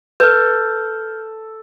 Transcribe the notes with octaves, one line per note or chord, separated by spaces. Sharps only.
A4 B4 F6 G6